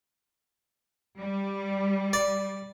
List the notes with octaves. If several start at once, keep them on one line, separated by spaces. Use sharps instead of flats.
G3
D5